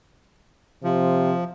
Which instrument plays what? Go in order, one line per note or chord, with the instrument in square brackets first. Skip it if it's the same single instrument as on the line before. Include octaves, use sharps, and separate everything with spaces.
[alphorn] C3 [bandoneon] F3